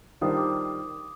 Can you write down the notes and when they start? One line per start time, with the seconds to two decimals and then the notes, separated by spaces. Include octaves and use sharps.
0.21 D#3 G3 D4 F4 C5 D#6
0.37 D6